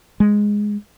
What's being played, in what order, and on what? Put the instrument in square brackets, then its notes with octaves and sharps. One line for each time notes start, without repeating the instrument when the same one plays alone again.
[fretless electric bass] G#3